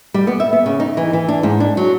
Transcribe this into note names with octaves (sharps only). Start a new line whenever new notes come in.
G3
B3
E5
B3
C#3
D#4
E3
E3
D4
G#2
D4
F#3